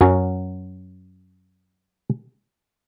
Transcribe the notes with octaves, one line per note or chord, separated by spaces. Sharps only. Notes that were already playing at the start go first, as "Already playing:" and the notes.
F#2 F#3 C#4 F#4